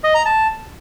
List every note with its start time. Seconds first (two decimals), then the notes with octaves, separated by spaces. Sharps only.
0.04 D#5
0.15 A#5
0.25 A5